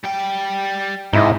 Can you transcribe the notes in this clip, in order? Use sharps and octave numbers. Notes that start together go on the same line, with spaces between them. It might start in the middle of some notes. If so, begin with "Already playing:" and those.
G3 G5
G#2 C3 D#4 E4 D#5